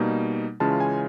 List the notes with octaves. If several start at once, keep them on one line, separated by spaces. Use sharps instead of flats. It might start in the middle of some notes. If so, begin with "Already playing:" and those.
Already playing: B2 G3 A#3 D#4
C#3 E3 G#3 C#4 F4 A5
G#5